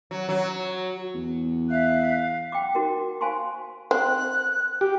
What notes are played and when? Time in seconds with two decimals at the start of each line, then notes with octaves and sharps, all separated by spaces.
0.11 F#3
0.29 F#3
1.14 E2
1.70 E5 F5 F#6
2.52 F#5 G5 D6
2.75 D#4 F#4 A#4
3.21 C5 F5 G#5 A5 C6 C#6
3.91 C4 F#6
4.81 G4